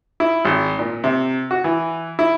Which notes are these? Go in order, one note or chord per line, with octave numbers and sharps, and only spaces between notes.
E4
G#1
A#2
C3
F#4
E3
E4